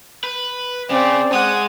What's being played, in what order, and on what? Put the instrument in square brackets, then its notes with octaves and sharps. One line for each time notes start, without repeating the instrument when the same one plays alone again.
[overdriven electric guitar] B4
[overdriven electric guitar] C#3 [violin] C4 [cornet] D5
[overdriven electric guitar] G#3 [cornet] F#5 [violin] D#6